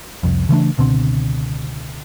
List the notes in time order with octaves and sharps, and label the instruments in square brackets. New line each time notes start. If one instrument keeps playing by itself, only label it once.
[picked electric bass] C2 F2
C#3 E3 A3 D4
C#2 B2 D3 C4